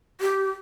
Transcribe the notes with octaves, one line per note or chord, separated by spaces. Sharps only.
G4